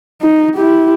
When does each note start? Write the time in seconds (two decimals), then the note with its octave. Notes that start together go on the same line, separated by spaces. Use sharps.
0.21 D#4
0.55 E4 G4